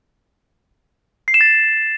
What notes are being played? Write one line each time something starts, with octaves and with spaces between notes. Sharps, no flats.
C7
E7
A6